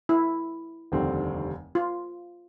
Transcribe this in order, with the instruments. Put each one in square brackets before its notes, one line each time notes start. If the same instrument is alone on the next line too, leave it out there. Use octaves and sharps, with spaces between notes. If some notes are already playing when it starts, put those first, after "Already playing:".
[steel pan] E4
[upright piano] F1 D#2 D3 G3 C4
[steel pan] F4